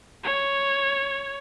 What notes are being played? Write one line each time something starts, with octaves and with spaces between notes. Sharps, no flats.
C#5